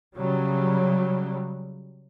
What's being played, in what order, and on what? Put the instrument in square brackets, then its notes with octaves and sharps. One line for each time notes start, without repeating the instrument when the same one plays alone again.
[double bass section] C#3 F#3 G3